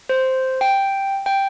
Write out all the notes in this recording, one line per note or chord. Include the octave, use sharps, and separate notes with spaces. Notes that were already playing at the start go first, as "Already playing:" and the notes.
C5
G5
G5